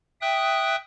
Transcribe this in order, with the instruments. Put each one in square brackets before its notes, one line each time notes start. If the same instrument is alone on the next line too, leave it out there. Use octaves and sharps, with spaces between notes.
[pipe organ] E5 G5 D#6 F#6